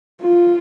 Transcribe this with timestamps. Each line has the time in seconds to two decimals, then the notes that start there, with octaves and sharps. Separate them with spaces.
0.22 F4